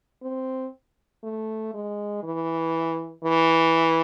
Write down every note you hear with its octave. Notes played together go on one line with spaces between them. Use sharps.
C4
A3
G#3
E3
E3